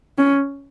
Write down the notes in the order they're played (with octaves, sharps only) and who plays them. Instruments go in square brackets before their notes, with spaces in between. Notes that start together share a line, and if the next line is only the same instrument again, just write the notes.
[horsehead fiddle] C#4